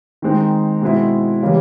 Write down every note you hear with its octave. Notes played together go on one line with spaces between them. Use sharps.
D#3 G#3 C4 D#4
B2 G#3 C4 E4
C#3 E3 G3 A#3